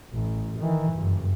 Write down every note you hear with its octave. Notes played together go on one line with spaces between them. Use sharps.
A1
D#3 E3
F#1 G2